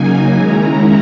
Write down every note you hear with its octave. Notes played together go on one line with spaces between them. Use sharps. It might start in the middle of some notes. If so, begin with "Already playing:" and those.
Already playing: C#3 F#3 A#3 D#4 G#5
D#3 G#3 C#4 E4 A#5